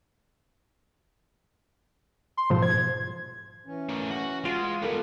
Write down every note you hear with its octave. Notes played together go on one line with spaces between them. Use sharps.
C6
G#2 B2 F3 C5
G#6
E3 C#4
A3 A#4
F#4
G#3 F4 D7
G3 B3 A4 A#4